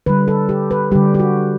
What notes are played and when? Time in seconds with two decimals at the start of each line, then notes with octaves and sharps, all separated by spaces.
0.06 D3 G3 B4
0.28 A4
0.49 G4
0.71 B4
0.91 D3 G3 G4
1.15 G4
1.19 F#4